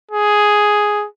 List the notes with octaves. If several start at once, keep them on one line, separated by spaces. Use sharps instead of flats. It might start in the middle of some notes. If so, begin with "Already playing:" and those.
G#4